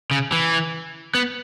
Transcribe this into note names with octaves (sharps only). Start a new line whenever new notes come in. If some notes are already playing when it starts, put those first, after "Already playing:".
C#3
E3
B3